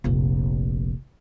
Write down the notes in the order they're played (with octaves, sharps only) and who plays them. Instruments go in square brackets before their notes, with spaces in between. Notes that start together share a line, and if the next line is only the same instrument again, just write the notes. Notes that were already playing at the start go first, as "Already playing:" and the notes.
[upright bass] F1 A#1